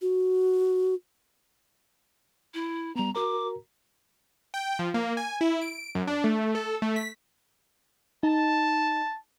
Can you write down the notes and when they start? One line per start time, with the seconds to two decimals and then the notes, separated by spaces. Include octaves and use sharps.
0.02 F#4
2.54 E4
2.96 G3 B3 A#5
3.15 F#4 A#4 A#5 D6
4.54 G5
4.79 F3
4.94 A#3
5.17 G#5
5.41 E4
5.61 D7
5.95 F#2
6.07 D4
6.24 A3
6.55 A4
6.82 A3
6.96 B6
8.23 D#4 A5